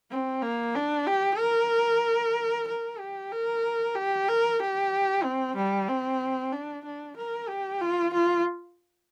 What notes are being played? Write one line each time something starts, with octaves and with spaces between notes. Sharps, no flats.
C4
A#3
D4
G4
A#4
A#4
G4
A#4
G4
A#4
G4
C4
G3
C4
D4
D4
A#4
G4
F4
F4